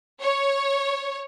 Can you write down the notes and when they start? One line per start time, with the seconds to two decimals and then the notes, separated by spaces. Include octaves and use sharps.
0.21 C#5